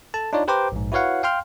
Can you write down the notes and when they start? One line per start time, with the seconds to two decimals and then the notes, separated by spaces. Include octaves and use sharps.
0.14 A4 A5
0.33 D4 D#4 F4 C#5 D5
0.48 G4 B4 C5 G5 A#5 D6
0.72 A#1 G#2
0.92 E4 F#4 B4 C#5 F5 F#5
1.23 F5 G5 C6 F6